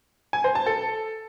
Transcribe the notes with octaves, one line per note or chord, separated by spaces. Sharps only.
G#5
C5
A5
A4